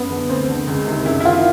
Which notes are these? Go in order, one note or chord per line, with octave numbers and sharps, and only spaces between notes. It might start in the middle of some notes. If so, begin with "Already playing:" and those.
Already playing: F#2 B3
D3
D2 C4
D3
C#2
C3 D#3
F#2 E4
E4
D#3 F4